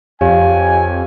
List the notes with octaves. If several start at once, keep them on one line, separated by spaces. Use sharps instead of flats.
F2 G4 C#5 F5 G#5